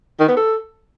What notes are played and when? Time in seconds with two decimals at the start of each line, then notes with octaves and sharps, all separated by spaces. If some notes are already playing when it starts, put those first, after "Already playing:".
0.20 D#3
0.28 B3
0.37 A4